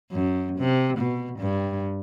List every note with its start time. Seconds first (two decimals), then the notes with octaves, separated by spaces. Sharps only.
0.12 F#2
0.59 C3
0.98 B2
1.39 G2